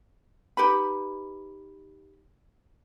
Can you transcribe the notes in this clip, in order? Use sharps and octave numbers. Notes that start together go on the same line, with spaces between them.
D#4 G4 B4 B5